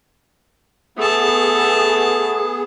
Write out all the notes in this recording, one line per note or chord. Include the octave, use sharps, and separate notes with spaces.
A3 B3 G#4 A5